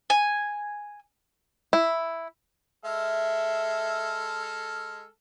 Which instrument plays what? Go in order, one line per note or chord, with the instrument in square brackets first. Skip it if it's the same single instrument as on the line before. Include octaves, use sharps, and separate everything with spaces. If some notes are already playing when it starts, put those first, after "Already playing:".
[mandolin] G#5
[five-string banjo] E4
[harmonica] G#3 A4 F6 [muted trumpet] E5